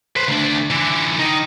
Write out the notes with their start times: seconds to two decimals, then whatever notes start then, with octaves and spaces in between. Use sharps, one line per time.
0.16 B4 C5
0.28 D2 D4
0.70 D3 E3
1.19 D#3